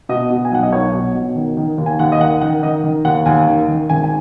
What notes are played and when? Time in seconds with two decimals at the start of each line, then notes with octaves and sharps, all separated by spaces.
0.09 B2 D#5
0.30 B2
0.45 G#5
0.52 B1 F#5
0.63 D#5
0.72 B1 C#5
0.93 B2
1.15 B2
1.35 D#3
1.57 D#3
1.78 D#2
1.86 G#5
1.99 D#2 F#5
2.12 D#5
2.20 D#3 F#5
2.41 D#3 F#5
2.63 D#3 D#5
2.84 D#3
3.05 D#2 F#5
3.26 D#2 G#5
3.47 D#3
3.68 D#3
3.90 G#1 G#5
4.04 G#5